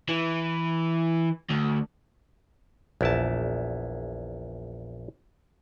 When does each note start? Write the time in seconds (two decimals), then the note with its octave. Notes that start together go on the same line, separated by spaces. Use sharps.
0.09 E3
1.50 D2
3.01 A#1 E2 E4 B4 A5